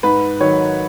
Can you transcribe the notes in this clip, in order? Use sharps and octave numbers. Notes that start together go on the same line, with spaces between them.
G#2 B4
D#3 F#3 C#5